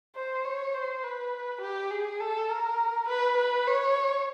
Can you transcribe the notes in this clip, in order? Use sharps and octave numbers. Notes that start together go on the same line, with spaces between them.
C5
C#5
C5
B4
G4
G#4
A4
A#4
B4
B4
C#5